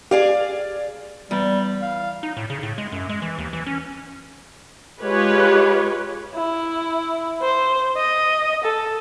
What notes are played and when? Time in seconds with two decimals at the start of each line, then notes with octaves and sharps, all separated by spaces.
0.11 G4 G#4 D5 F5
1.31 E2 G3
1.81 F5
2.23 D#4
2.37 A2
2.50 C#3
2.63 A2
2.78 G#3
2.92 F#2
3.09 G#3
3.22 E3
3.38 D#2
3.53 E3
3.67 C#4
5.01 G#3 F4 G4 G#4 B4 C#5
6.35 E4
7.42 C5
7.97 D#5
8.64 A4